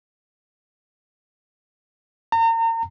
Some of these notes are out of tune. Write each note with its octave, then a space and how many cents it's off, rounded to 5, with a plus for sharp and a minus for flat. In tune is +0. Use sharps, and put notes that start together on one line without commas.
A#5 -35